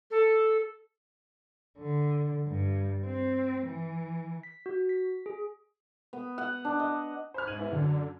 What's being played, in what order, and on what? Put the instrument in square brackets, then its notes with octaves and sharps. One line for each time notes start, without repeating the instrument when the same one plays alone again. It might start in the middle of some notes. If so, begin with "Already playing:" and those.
[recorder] A4
[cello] D3
G2
C4
E3
[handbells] B6
F#4
B6
G#4
[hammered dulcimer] B3
F#5
D4
D#5
[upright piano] C5 B5 F6
[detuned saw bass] G#2 [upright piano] G#6 D#7 F#7
[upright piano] B3 E4
[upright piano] F#2 F#3 [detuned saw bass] D3